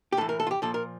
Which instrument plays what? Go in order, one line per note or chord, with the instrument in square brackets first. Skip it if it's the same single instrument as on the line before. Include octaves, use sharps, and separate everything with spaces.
[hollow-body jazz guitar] G4
A2 E3 A4
A#4
A4
F4
G4
A#2 F3 A4
A#4